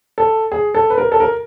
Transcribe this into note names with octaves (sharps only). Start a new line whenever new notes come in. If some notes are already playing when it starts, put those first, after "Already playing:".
A4
G#4
A4
B4
A#4
A4
A#4